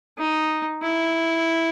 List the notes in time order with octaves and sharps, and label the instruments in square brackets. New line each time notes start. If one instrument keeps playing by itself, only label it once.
[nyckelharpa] D#4
E4